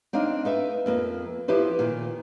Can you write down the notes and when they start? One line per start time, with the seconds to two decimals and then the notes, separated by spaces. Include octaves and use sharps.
0.13 C4 D4 D#4 F5
0.45 D#4 B4 E5
0.86 F2 A#3 B4
1.48 F3 E4 G4 B4 C5
1.79 A#2 D#3